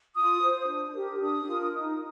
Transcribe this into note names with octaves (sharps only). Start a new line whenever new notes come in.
F4 D#6
C5
D4
G4 A#4
D4 D#6
F4 A#4
D#4